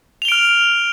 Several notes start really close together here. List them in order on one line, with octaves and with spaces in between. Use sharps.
F7 G7 D7 F6